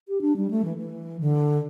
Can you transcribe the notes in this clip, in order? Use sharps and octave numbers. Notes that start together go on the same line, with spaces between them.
G4
D4
G3
A3
E3
E3
D3